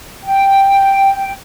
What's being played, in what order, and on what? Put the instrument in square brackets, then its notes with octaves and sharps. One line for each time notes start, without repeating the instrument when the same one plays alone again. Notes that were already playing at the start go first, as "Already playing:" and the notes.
[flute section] G5